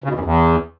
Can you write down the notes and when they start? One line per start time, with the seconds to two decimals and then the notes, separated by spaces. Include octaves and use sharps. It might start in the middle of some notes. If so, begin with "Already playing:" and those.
0.04 C#3
0.09 B2
0.14 E2
0.20 F#2
0.25 E2